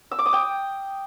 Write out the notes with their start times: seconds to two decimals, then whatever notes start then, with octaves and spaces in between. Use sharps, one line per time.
0.11 E6
0.19 D6
0.26 D#6
0.33 G5